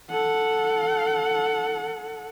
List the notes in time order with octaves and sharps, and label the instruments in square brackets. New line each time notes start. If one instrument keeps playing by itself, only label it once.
[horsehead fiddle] A4 F#5